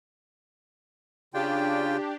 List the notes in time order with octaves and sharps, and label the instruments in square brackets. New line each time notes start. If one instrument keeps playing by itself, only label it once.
[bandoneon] C#3 F4 G5 [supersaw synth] D4 G4